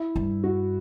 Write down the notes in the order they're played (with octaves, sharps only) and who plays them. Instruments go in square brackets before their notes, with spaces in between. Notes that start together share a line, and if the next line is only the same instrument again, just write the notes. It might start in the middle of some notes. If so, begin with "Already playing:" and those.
Already playing: [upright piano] E4
[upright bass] G2
[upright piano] F#4